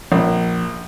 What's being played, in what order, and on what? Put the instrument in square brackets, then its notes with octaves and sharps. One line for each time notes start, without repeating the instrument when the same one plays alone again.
[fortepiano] A#1